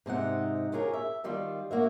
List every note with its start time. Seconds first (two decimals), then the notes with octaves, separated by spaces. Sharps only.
0.06 G#2 C3 D#4 F#5
0.72 C#4 F4 G4 G#4 A#4 C#5
0.93 E5
1.24 D#3 G3 F4
1.71 A#3 F#4 E5